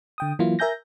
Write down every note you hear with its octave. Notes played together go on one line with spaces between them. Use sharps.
D3 G5 D#6
E3 F#3 A#3 E4 F4
A#4 E5 G#5 G6 A#6